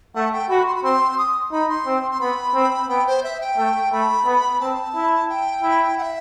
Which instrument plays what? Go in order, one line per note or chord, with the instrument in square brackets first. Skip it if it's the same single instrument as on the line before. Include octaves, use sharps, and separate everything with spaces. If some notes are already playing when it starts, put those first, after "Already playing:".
[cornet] A3 [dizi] F#5
[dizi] G5
[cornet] F#4 [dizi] B5
[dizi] C6
B5
[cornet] C4 [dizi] C6
[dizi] D#6
[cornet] D#4 [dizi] B5
[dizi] C6
[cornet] C4
[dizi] C6
[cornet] B3 [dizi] B5
[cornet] C4
[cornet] B3 [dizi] G5
[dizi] C5
E5
G5
[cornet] A3
[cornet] A3 [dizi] B5
[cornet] B3
[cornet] C4 [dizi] A5
[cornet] E4
[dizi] G5
[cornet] E4
[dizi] F#5
E5